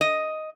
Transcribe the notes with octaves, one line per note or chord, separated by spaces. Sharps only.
D#5